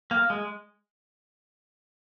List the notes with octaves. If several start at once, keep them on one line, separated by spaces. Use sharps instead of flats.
A#3
G#3